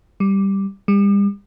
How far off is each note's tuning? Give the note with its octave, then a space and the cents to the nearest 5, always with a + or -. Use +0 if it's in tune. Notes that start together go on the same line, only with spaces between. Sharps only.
G3 +0
G3 +40